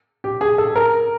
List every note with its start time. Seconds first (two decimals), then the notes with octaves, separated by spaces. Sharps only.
0.24 G4
0.41 G#4
0.58 A4
0.76 A#4